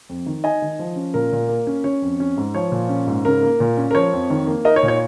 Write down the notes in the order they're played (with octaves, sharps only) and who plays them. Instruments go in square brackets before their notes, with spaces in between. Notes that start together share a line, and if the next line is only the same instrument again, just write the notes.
[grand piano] F2
D#3
D#4 D#5 G#5
D#3
F3
C#4
A#2 A#4
A#2
A#3
C#4
C#4 C#5
F2
C#4
G#2
F3 C#5
A#2
C#4
G#2
C#3 A#4
A#3
A#2
C#4
A#4
F3 C#5
F2
D#3
A#3
D#4 A#4 D#5
C#5
A#2
C#5